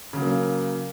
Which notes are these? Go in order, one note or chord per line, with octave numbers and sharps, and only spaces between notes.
C#3 F#3 A#3